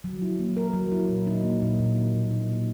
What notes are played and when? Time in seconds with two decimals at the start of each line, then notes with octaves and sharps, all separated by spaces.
0.04 F#3
0.22 E4
0.39 A#3
0.57 A#4
0.73 F#3
0.92 E4
1.09 A#2
1.27 D#4
1.44 A#3
1.62 A#2
1.79 A#2
1.96 D#4
2.14 B2
2.31 D#4
2.49 A#3